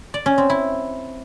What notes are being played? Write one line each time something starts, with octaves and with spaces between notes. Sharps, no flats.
D5
C#4
C4
E4